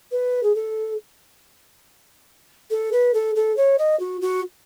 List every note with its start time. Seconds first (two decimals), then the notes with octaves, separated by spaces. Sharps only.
0.12 B4
0.43 G#4
0.55 A4
2.71 A4
2.92 B4
3.14 A4
3.36 A4
3.57 C#5
3.78 D#5
4.00 F#4
4.21 F#4